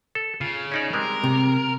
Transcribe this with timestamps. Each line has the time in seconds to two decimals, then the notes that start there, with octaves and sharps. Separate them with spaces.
0.15 A4
0.41 C#3 F4
0.72 C#4 D#4 D5
0.93 G3 G#3 C4 A#4
1.24 C3